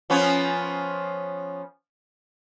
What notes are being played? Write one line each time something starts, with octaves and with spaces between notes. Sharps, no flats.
F3 B3 C#4